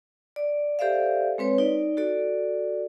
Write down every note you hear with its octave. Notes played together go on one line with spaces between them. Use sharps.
D5
G4 A4 C5 D5 E5 F5
G#3 C4 B4 C#5
D#4 D5
F#4 A4 D5